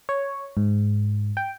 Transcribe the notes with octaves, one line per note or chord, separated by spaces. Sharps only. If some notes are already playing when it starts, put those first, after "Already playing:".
C#5
G#2
G5